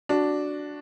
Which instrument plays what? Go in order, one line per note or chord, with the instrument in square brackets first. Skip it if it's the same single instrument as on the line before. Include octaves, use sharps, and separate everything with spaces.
[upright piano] D4 F#4